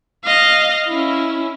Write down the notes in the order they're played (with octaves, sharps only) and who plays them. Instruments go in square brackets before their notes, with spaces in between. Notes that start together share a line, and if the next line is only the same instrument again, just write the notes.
[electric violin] D#5 F5
C#4 E4